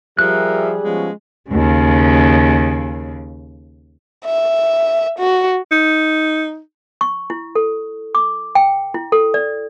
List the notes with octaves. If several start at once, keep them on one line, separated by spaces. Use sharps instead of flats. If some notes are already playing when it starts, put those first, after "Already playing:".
F3 G3 G4 G#4 A#4 E5 F#6
F3 G#3 B3 C#4
D#2 C#3
E5
F#4
D#4
C#6
E4
A4
D6
G5
E4
A4
D5